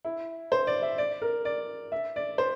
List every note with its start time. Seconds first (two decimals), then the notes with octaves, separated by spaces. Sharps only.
0.05 E4
0.52 C5
0.67 D5
0.82 E5
0.98 D5
1.22 A#4
1.45 D5
1.92 E5
2.16 D5
2.38 C5